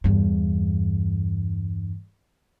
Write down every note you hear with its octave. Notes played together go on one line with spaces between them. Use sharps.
E2 G2